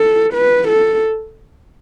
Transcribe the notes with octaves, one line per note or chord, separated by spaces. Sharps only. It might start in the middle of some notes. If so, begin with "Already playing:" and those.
Already playing: A4
B4
A4